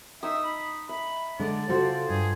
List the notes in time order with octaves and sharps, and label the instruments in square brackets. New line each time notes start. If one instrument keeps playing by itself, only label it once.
[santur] D#4 D#6 [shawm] E5
[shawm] B5
[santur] E5 [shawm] B5
[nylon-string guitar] D3 G#3 [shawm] D5
[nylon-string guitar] C#3 F#4 A4 [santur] F4 C5
[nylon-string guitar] G2 [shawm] G#4